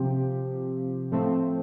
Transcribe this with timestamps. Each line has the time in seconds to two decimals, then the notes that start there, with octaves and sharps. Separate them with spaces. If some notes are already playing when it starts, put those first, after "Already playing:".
Already playing: C3 F3 C4 G4
1.12 A2 F3 A3 C4